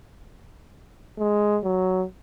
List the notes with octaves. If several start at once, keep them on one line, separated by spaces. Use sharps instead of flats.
G#3
F#3